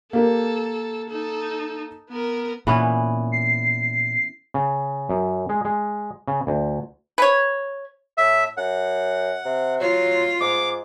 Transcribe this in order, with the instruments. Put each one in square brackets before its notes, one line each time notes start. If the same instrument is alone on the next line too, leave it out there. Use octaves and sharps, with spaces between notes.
[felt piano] A#3 G4 A#4 [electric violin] A4
[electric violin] D#4 A4
B3 A#4
[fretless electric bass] A#2 [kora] E3 B3 C#4
[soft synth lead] C7
[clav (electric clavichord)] C#3
F#2
G#3
G#3
C#3
D2
[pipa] B4 C#5
[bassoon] A2 [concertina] E5
[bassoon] F#2 [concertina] F#5
[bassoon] C3
[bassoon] F#3 [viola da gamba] F4
[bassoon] G#2 [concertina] D6